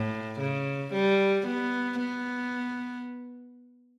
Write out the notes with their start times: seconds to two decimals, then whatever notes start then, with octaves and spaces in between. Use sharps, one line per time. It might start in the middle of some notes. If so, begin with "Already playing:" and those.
Already playing: A2
0.40 C#3
0.93 G3
1.47 B3
2.00 B3